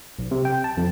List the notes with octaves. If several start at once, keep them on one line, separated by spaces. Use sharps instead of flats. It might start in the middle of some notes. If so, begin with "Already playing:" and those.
B1
C3
G5
A5
F2